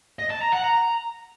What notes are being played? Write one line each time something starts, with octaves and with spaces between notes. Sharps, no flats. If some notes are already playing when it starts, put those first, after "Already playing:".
D#5
A5
A#5
F#5
A#5